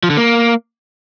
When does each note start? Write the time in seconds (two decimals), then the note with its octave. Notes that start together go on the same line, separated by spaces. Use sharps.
0.03 F3
0.10 D3
0.17 A#3